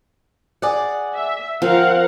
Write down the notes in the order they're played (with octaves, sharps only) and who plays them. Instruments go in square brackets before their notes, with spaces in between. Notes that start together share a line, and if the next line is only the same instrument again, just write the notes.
[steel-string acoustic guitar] G#4 D5 F#5
[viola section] E5
[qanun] F3 [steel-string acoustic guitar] C4 [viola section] A#4 F5 F#5